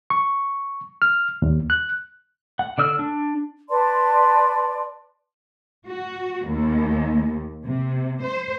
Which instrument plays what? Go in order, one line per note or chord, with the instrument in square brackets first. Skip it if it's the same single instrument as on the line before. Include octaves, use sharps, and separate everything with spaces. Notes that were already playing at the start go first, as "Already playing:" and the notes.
[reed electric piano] C#6
F6
D#2
F#6
[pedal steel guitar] F#5
D3 D5 E6 F6
D4
[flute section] B4 D5 A5 C6
[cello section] F#4
D#2
C3
C5